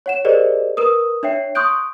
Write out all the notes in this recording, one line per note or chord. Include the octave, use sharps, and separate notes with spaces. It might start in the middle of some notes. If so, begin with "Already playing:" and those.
C#5 F#5 E7
G4 G#4 A#4 C5 D5 D#5
A#4 B4 D#6
D4 C#5 E5 G5 C7
C6 C#6 D#6 F#6 G6 D7